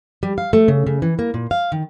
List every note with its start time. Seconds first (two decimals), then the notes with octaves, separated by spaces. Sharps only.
0.23 G3
0.38 F5
0.53 A3
0.68 C#3
0.86 C#3
1.02 E3
1.19 A#3
1.34 A#2
1.51 F5
1.72 D#3